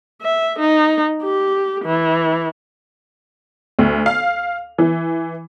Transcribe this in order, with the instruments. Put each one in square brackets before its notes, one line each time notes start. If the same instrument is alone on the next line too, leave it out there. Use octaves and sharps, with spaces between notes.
[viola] E5
D#4
G4
E3
[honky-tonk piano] D2
F5
E3